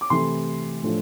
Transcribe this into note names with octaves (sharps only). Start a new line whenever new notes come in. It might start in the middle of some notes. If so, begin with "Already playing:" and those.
D6
C3 E3 A3 C6
A2 F3 A3 D4 F4